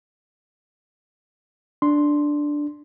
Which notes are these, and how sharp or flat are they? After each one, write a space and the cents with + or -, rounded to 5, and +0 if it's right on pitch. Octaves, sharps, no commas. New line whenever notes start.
D4 +0 C6 +0